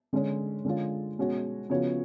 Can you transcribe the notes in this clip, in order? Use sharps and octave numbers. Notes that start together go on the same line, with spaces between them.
D3 G#3 C#4
D3 G#3 C#4 F4
B2 G#3 C#4 F#4 C#5
C#3 F3 B3 F#4 C#5